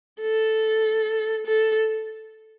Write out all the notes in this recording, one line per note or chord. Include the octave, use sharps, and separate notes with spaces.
A4
A4